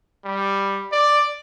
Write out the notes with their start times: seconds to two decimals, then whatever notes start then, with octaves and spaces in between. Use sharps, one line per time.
0.25 G3
0.92 D5